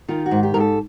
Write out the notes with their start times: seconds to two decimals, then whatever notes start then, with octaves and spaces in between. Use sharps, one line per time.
0.09 D#3 F4
0.26 F#4
0.31 G#2
0.43 G4
0.54 G#2 A#4
0.60 A4